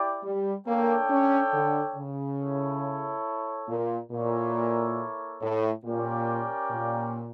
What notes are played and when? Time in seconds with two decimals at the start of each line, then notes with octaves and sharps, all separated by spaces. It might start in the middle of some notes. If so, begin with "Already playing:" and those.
Already playing: E4 G4 D5 G5
0.24 G3
0.67 A#3 D4 A4 C#5 G5
1.10 C#4
1.53 D3
1.96 C#3
2.39 E4 A4 C#5
3.69 A#2
4.12 A#2 A#3 E4 A4 C#5
5.42 A2
5.85 A#2 C#4 G4 A#4 D5 G5
6.72 A#2